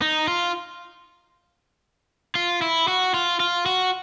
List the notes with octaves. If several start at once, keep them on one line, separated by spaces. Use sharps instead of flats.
D#4
F4
F4
E4
F#4
F4
F4
F#4